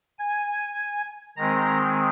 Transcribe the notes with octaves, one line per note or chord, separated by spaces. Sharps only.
G#5
D#3 G#3 C4 A#5